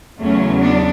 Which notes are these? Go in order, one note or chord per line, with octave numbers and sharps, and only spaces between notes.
E2 C#3 F#3 A3 C#4
B3 D4